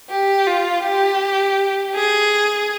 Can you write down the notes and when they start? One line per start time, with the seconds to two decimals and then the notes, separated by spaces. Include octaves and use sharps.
0.10 G4
0.47 F4
0.84 G4
1.95 G#4